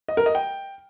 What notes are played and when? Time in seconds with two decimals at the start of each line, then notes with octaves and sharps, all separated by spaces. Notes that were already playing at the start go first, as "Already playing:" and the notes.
0.08 D#5
0.17 A#4
0.26 D#5
0.35 G5